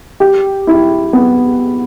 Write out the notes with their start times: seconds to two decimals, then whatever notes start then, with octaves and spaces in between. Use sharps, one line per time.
0.20 G4
0.67 E4
1.13 B3